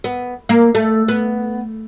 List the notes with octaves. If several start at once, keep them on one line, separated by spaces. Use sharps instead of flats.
B3
A#3
A3
B3